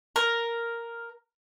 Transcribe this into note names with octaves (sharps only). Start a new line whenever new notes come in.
A#4